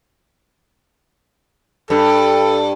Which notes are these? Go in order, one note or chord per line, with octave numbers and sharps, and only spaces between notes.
G2 A4